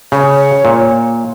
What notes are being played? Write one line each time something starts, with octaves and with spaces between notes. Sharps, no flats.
C#3 C#5
A#2